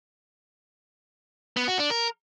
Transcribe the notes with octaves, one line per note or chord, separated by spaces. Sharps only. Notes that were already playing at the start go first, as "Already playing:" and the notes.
B3
F#4
D4
A#4